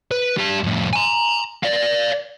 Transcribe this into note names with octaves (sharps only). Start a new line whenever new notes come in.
B4
G3 A5
F2 A2
G#5 A#5
D5 F5